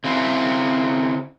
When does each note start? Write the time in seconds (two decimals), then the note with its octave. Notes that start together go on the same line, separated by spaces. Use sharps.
0.04 C#3 C4 E4